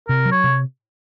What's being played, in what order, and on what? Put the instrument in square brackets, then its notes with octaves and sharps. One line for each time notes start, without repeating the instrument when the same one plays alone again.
[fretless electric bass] C3 [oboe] A#4
[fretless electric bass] F#3
[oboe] C#5
[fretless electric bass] C3